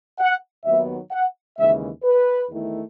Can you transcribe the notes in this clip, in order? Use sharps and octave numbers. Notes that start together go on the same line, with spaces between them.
F#5
D#2 D#3 F#3 B3 E5
F#5
D#2 C#3 E3 G#3 E5
B4
E2 D#3 A3 E4